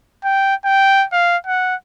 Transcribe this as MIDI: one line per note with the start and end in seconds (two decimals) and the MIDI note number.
0.24 0.55 79
0.65 1.05 79
1.13 1.37 77
1.47 1.75 78